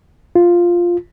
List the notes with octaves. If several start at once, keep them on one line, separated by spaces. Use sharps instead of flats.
F4